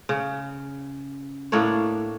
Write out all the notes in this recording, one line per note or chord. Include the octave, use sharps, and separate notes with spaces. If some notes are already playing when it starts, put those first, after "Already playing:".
C#3
A2 A#3 D4 C#5